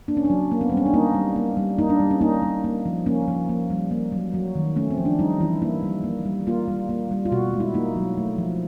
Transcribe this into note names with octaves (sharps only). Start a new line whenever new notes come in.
A#3 D4
C#4
D4
F#3
A#3
B3
G3 C4
C#4
D4
A#3 D#4
G3
A#3
G3
A#3 D#4
D4
G3
C#4
A#3 D#4
G3
A#3
F3
A#3 C#4
F3
A#3
G3
A#3
F#3
F#3
D#3
A3 C#4
C4
F3
D4
G3 D#4
E3 E4
A#3 E4
G3
A#3
G3
A#3 F4
G3
A#3
G3
F4
B2 F#4
G#3
E4
A#3 D#4
F#3
A3
F3